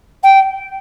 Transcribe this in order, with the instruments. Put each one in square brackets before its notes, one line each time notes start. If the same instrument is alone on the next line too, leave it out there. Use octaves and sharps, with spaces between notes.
[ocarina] G5